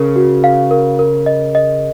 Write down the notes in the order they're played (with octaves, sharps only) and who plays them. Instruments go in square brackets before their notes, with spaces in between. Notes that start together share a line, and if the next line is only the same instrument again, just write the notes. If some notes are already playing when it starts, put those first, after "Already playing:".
Already playing: [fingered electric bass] C#3 [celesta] A#4
[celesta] F#4
F5
A#4
A#4
D#5
D#5